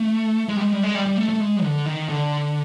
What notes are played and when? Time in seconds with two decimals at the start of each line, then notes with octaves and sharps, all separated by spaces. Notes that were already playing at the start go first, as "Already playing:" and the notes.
Already playing: A3
0.49 G#3
0.56 G3
0.61 G#3
0.72 G3
0.83 G#3
0.95 G3
1.06 G3
1.17 A3
1.29 A3
1.40 G#3
1.63 D3
1.86 D#3
2.09 D3